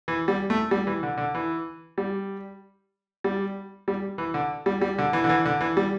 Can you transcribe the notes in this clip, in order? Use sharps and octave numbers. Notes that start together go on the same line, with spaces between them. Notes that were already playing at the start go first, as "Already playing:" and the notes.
E3
G3
A3
G3
E3
D3
D3
E3
G3
G3
G3
E3
D3
G3
G3
D3
E3
D3
E3
D3
E3
G3